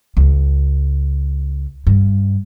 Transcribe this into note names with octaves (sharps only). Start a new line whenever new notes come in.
C#2
G2